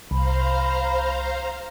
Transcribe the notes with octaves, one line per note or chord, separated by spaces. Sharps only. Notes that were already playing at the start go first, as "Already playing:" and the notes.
C2 C5 F5 A#5 B5